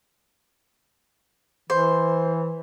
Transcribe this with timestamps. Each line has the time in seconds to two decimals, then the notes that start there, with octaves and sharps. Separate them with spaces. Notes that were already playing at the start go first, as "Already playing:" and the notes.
1.70 E3 C5